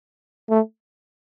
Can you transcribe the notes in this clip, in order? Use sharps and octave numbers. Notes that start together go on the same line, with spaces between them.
A3